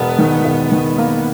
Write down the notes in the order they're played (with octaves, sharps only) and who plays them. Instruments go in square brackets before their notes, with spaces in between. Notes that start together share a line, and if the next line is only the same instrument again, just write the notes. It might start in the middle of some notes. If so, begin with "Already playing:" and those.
Already playing: [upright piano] E1 [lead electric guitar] B3
[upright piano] D#3
E1
D#3
A#3